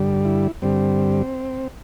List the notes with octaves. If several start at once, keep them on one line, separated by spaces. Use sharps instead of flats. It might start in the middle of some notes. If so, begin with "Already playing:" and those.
Already playing: G2 D3 G3
E4
G2 D3 G3 C4